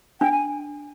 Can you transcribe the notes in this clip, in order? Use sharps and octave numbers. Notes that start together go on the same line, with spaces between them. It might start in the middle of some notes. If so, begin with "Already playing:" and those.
D4 G5
G#5